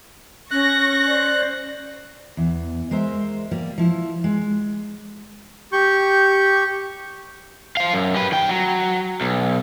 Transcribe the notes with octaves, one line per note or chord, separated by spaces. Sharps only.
C#4 C#6 F#6 A#6
C5 D5
E2
G#3 A#4 C5 E5
G3 A#3
F3 E4
G#3
G4 C#6 G6
C5 F5
F#2
G4 B4
D#3 G5
F#3
B1